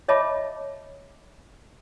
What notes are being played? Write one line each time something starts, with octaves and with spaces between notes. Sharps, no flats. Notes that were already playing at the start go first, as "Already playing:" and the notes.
C#5 D#5 E5 A5 B5 D6